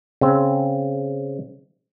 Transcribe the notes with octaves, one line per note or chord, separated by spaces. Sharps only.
C#3 C4